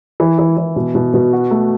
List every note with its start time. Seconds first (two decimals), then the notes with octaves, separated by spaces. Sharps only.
0.20 E3
0.39 E3
0.57 E3
0.76 B2
0.95 B2
1.14 B2
1.33 F#4
1.51 A3